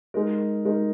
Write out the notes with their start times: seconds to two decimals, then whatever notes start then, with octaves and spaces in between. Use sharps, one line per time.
0.14 G#3 D#4 A#4
0.65 G#3 D#4 A#4